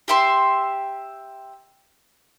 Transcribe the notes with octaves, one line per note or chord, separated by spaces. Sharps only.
G4 E5 C6